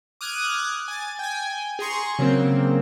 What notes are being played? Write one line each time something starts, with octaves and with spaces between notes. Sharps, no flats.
D6 D#6 F6 F#6 G#6
G#5 A6
G5 G#5
G#4 A#5 C6 C#6
C#3 F#3 A#3 C4